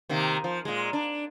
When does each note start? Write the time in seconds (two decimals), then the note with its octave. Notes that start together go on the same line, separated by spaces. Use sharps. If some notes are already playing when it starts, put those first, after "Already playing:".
0.09 C3 D#3 A#3
0.44 F3
0.65 A#2 G#3
0.93 D4